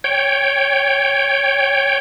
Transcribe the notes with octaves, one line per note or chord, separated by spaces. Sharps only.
C#5 G5